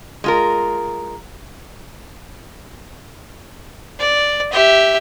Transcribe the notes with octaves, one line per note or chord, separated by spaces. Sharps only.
G#3 F4 A#4
D5
G4 E5